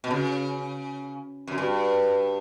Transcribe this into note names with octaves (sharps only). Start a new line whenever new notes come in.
B2
C#3
F#2
G2